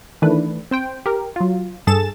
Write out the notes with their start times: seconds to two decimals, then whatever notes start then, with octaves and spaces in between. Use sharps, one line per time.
0.22 D#3 E3 A3 D4 B4
0.71 C4 C5 G5
1.06 G4 A#4
1.36 F#3 F4
1.87 G2 G#4 A4 A6 E7